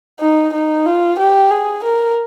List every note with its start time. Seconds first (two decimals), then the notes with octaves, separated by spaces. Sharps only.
0.20 D#4
0.53 D#4
0.86 F4
1.19 G4
1.51 G#4
1.84 A#4